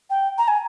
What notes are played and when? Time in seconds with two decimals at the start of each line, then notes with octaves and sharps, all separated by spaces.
0.10 G5
0.38 A#5
0.48 G#5